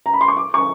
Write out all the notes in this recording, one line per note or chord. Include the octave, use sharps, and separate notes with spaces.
A#5
B5
C6
C#6
D6
C#6